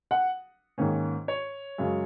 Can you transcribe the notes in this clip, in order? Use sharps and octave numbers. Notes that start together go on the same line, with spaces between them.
F#5
G#2 D#3 A#3 C#4
C#5
F#2 C#3 G#3